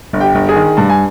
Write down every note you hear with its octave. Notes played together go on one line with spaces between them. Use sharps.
G1
G4 G5
G1
G#4 G#5
D#3
G2 A5
G#5